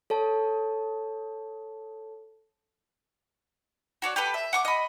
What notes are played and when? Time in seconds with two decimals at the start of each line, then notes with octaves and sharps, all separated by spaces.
0.10 A4 C#5 A5
4.02 F#4 C#5 D5
4.16 G4 A4 B4
4.34 E5
4.53 F#5 C#6 D6
4.65 D#5 B5